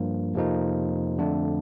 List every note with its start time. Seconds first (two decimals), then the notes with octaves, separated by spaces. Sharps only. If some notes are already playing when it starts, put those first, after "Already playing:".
Already playing: G2 F3 A#3
0.34 F2 C3 F3 A#3 D#4
1.18 F2 D3 A3 D4